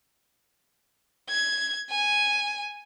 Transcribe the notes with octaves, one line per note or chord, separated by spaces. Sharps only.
G#6
G#5